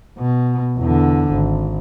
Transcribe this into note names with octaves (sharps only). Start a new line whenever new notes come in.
B2
E2 D3
G#1